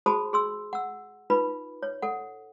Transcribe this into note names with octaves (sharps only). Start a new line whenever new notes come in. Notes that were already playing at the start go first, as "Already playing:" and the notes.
F#4 G#4 C5 A5 B5 D#6
G#4 C6 E6
F#5 E6
D#4 F4 B4 B5
C#5
A4 F#5